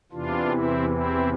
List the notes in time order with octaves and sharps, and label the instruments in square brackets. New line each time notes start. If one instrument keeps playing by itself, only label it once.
[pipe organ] E2 C3 E3 D4 F4
C4 E4
C4 E4